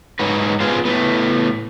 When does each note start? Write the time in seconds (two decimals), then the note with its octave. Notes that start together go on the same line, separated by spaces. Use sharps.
0.19 G#2 F#3 F#4 B4
0.60 B3 F4 G#4 C5
0.85 A2 A3 B3